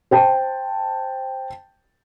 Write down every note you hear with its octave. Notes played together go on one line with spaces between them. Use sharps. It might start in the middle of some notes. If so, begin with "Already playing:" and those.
C5 G5 A5